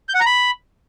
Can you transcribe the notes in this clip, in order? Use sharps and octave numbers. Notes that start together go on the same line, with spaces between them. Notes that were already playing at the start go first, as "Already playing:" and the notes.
G6
F#5
A#5
B5